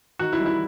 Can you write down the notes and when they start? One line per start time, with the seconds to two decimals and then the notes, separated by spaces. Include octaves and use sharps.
0.19 D#3 F#4
0.33 E4
0.40 G3
0.46 E4